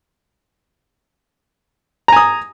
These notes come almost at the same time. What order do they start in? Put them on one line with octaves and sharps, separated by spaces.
A#5 G#5 D#6